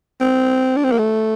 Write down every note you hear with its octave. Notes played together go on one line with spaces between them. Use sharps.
C4
D4
C4
A#3
A3